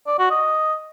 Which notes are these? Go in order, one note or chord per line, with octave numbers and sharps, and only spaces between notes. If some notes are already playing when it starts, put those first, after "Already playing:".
D5
F#4
D#5